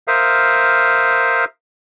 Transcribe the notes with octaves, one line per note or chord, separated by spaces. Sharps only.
A#4 C5 E5 F5 D#6